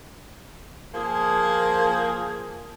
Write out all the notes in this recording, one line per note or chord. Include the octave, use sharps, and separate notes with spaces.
F3 A#3 G#4